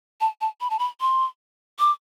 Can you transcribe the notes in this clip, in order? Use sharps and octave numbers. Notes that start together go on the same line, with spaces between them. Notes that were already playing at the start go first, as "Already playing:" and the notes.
A5
A5
B5
A5
B5
C6
D6